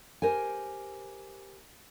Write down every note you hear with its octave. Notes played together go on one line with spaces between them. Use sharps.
G4 A#4 C5 G#5